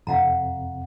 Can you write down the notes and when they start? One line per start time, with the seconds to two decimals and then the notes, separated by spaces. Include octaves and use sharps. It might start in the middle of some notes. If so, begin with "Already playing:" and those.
0.07 F2 C3 F5 F#5 A#5